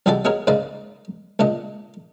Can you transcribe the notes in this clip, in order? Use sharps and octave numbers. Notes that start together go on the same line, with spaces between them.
C2 G3 G#3 F#4 A4 D5
G#3 F#4 G#4 A#4 C#5
G#2 C#3 A#3 D5 D#5
C#2 A#2 D4 D#5